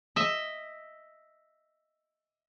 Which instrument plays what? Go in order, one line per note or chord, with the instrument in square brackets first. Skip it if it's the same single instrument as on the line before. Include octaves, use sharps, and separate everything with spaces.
[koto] D#5 E5